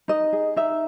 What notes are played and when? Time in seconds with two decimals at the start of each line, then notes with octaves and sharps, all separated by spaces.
0.08 D#4 D#5
0.33 G#4
0.56 D#4 E5